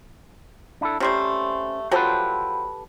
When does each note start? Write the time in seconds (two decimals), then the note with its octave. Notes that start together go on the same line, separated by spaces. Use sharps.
0.81 D4 E4 A4
1.00 C3 G3 A3 C#4 C5
1.91 F3 F#3 G4 A4 B4 C5